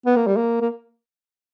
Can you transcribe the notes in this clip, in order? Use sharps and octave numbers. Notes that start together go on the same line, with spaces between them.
B3
A#3
G3
A#3
A#3